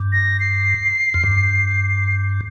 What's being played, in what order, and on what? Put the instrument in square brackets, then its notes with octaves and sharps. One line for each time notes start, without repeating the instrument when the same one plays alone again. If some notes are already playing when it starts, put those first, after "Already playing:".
Already playing: [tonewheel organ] G2
[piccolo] A#6
C7
[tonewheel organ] F2
G2